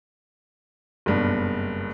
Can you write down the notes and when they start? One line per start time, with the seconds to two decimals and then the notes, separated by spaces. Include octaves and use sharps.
1.06 F#1 G2 B2